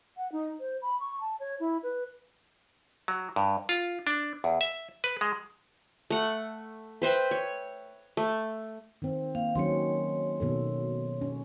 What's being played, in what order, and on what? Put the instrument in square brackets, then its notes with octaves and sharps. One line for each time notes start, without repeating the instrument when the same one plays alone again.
[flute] F#5
D#4
C5
B5
C#6
A5
C#5
E4
B4
[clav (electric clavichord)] F#3
G2
F4
D4
E2
E5
B4
G#3
[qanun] A3 F#5
B4 C5 E5 G5
C#5
A3
[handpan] D#3 C4
[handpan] A#3 [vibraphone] F5
[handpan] D#3 F#3 C#4 [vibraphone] C#5 C6
[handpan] B2 D#3 A4
C#4